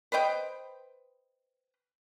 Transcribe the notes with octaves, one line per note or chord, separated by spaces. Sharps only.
B4 C5 D#5 G5